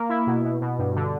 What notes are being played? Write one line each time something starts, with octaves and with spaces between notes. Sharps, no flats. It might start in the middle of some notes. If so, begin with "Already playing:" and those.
Already playing: A#3
E4
B2
B2
B2
G2
D3